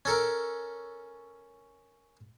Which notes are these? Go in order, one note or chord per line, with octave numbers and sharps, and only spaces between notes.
C#4 A4 A#4